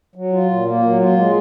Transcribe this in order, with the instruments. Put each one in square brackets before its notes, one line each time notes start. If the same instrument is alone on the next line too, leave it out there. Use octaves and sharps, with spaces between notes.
[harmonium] F#3
F4
A#2
A#3
F#3
F4
G#3